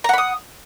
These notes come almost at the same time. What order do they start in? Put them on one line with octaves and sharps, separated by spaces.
A#5 F#5 B5 D#6